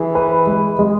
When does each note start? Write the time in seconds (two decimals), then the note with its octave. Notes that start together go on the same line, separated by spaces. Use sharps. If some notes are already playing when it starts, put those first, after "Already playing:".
Already playing: E3 G#4
0.15 B4
0.47 G#3
0.79 G#3